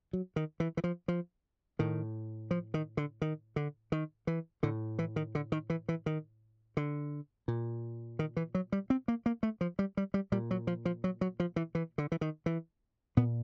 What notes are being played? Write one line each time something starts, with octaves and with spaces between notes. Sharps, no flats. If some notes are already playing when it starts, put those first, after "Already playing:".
F#3
D#3
E3
E3
F3
F3
A2 D#3
F3
D#3
D3
D#3
D3
D#3
E3
A2 D3
E3
D#3
D3
D#3
E3
E3
D#3
D3
A#2
D#3
E3
F#3
G3
C4
A#3
A#3
A3
F3
G3
G3
G3
A#2 G3
F#3
F3
F3
F#3
F#3
F3
E3
E3
D3
E3
D#3
E3
A#2 B3